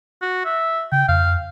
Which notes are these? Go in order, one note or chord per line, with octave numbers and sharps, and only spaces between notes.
F#4
E5
C#3 G5
F2 F5